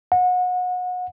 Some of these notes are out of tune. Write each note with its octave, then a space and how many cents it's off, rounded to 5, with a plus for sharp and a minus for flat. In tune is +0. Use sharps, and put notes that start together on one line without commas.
F#5 -30